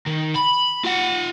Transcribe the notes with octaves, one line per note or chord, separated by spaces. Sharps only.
D#3
B5
F4 F#5